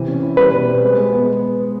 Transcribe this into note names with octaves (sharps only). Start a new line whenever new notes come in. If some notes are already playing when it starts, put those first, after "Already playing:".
Already playing: C3 E3
C#4
E4
G3 B4
B2
C4
G#3
G#3
B3